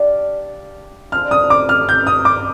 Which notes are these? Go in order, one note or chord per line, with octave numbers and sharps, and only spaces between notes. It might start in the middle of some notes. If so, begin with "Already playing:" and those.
Already playing: D4 G4 D5 F5
F3 G#3 D4 F6
D#6
D6
F6
G6
D#6
D6